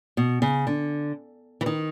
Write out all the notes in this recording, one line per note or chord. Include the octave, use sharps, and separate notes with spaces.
B2
C#3
D3
E3
D#3